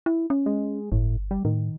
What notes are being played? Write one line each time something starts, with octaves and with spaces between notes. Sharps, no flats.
E4
C#4
G#3
G1 A2
G3
A2 D#3